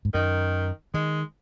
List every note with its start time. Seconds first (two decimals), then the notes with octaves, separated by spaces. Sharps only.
0.05 G#2
0.14 F#2 D#3
0.94 D#3 G#3